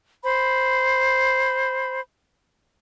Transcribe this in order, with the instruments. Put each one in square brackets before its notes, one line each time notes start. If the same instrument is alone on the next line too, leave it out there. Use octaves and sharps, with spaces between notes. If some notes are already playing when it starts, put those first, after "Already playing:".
[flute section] C5 B5